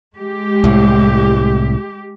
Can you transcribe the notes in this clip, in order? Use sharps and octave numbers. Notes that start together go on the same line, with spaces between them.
G#3 G4
C2 A2